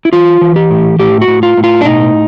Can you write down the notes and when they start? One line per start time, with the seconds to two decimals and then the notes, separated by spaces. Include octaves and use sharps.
0.05 E4
0.13 E3 F4
0.41 E3
0.56 G4
0.71 A2
0.99 A2 G4
1.21 F#4
1.28 A2
1.43 F4
1.57 A2
1.64 F4
1.81 D4
1.85 B2 D#4